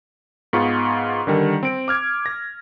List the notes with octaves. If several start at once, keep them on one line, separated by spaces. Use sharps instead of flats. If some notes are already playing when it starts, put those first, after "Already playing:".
G#2 B3 F4 G#4 C#6
D3 D#3 G3
C4 D7
D6 F6 G#6
A#6